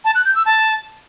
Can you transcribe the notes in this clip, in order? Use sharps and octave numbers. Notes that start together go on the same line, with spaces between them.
A5
F#6
G6
E6
A5